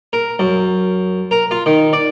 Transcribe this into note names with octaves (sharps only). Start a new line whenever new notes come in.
A#4
F#2
A#4
F4
D#3
D5